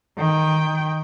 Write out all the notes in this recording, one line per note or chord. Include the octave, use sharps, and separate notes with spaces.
D#3 G5